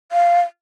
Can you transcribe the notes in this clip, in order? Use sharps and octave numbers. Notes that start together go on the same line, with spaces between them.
F5